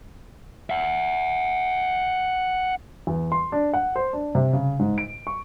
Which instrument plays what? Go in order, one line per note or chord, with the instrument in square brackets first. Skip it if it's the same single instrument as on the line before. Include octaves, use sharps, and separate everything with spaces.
[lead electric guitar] E5 F#5
[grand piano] E2
C6
D4
F#5
C5
D4
C3
C#3
G#2
D7
C#6